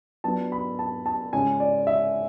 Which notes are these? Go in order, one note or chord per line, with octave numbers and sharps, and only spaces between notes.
F#3 B3 D4 A5
B5
A5
A5
C#3 G#3 C#4 G#5
D5
E5